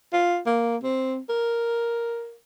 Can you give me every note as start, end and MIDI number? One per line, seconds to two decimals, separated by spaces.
0.13 0.39 65
0.46 0.76 58
0.83 1.18 60
1.29 2.35 70